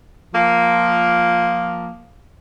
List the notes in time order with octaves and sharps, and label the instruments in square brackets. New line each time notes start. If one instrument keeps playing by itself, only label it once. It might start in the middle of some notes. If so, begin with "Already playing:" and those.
[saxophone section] F3 A#3